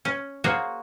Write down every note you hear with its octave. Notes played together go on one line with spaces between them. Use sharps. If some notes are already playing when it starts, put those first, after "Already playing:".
C#4
A#3 F#4 G#4 C5 C#5